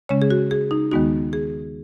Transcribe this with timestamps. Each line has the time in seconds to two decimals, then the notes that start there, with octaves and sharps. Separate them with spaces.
0.09 C#3 G#3 C#4 C#5
0.22 G#4
0.30 F#4
0.51 G#4
0.71 D#4
0.91 D#2 D#3 G#3 B3 D#4 F#4
1.33 G#4